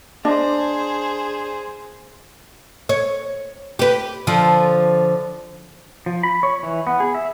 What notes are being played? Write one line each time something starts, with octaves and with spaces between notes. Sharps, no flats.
D4 G#4 C5 D#5
C#5
G4 B4
D3 F3
F3
B5
C#5
E3
B3
G#4
E5